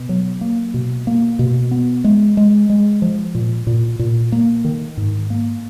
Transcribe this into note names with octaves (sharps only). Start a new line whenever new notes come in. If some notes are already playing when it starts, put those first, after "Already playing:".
Already playing: B2
F#3
A#3
B2
A#3
B2
B3
G#3
G#3
G#3
F3
A#2
A#2
A#2
A#3
D#3
G#2
A#3